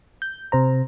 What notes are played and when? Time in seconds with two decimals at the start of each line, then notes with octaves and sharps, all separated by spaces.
0.22 G6
0.52 C3 C5 A#5